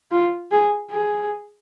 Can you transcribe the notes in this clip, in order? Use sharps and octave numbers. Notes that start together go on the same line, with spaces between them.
F4
G#4
G#4